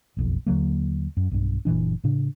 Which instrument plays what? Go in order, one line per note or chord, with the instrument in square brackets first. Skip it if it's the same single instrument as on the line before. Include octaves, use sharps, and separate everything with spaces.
[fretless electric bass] F#1 B1 F2
D#2 D3 F#3 A#3
F#2
B1 G2
F#1 A#2 E3 D4
A2 C#3 D4